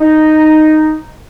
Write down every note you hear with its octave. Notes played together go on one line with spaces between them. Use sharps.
D#4